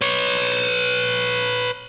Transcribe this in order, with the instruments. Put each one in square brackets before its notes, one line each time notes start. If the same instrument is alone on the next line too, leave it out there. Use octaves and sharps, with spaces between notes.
[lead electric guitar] B4 C#5